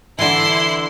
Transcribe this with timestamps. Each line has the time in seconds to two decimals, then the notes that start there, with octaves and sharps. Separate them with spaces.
0.19 D3 E3 E4 C6